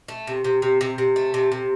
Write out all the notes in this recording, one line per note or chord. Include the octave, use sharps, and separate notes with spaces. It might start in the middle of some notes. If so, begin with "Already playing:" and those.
A3
C3
C3
C3
C3
C3
A3
C3
C3